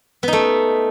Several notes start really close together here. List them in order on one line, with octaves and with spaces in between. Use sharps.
B3 D#4 A3